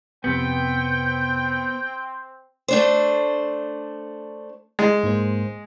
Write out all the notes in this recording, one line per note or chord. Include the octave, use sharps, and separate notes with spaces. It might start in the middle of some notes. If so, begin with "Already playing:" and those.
F2 C3 B3 C4 G5 G6
A3 D4 C5
G#3
G#2 A#3 C5